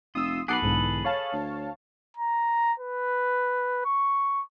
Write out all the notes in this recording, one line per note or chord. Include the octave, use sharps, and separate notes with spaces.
F1 F4 D#6 E6
B1 G#4 A4 B4 F#5 D6 C7
B1 E2 G#2 D3
C#5 F5 A5
D2
A#5
B4
C#6